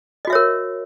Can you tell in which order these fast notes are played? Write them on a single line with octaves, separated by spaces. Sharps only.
D#5 F#4 E5 C#5 A#4